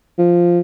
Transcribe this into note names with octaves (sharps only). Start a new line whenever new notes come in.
F3